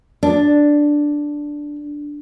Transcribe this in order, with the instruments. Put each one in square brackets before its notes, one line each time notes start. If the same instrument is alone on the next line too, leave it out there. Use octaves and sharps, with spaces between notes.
[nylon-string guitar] D4